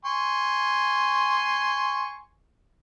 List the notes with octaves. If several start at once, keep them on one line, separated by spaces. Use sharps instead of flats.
G#5 C6 C#6